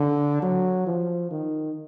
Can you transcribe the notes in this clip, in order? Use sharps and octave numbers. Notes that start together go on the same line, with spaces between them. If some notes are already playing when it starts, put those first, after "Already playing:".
Already playing: D3
F#3
F3
D#3